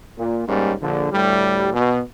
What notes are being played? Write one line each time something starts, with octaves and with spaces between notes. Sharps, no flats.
A#2
G#2 G3 A#3 C#4
A#1 D3
D2 A2 G3
B2